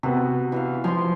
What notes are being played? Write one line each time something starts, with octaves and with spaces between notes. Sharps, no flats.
C3 B3 F#4
E3 E5 F5
F3 G#5 C6